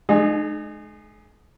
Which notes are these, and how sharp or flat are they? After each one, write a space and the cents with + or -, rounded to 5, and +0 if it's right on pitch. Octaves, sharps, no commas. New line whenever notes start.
G#3 +40 D#4 -35 G#4 +0